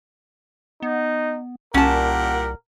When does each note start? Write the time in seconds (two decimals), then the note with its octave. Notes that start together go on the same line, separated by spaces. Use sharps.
0.82 B3 D#4
1.74 C2 A#2 C#4 G4 A#4 F#5 A5